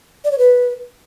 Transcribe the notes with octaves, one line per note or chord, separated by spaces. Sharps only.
D5
C#5
B4